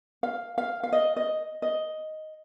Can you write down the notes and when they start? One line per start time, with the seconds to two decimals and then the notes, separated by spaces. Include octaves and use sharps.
0.23 F5
0.58 F5
0.83 F5
0.92 D#5
1.16 D#5
1.62 D#5